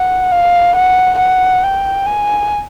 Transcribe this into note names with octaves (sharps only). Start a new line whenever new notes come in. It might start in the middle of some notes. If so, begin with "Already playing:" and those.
Already playing: F#5
F5
F#5
F#5
G5
G#5